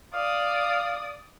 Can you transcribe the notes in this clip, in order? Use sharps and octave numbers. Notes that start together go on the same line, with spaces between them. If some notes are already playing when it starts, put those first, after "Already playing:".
D5 F5 D#6